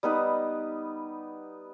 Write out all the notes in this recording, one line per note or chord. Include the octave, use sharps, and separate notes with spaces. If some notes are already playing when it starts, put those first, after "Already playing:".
G3 B3 D#4 B4